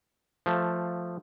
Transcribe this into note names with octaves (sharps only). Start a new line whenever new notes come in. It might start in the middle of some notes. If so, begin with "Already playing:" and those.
F3 A3 A5